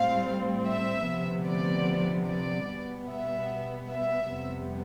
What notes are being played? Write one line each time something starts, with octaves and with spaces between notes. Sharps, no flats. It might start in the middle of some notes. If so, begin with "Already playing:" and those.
Already playing: A2 G3 C4 F5
E5
D2 C3 F3 B3
D5
D5
B2 G3 B3
E5
E5
F2 C3 G3 B3